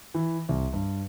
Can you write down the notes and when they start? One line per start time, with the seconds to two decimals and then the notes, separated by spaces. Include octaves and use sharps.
0.14 E3
0.49 C2
0.73 G2